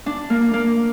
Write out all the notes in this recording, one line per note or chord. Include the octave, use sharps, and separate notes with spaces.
D4
A#3
A#3